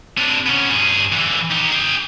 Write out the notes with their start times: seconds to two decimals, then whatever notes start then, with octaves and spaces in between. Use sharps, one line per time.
0.18 C3 D4
0.46 B3 C#4
0.69 G2 G#4
1.12 D3 E3
1.51 D#4 G4
1.71 G#4 G5